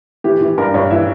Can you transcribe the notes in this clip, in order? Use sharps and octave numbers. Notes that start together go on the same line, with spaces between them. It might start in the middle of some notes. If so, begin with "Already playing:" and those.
E3 G4
E3
G2 A#4
G2 C#5
E3 E5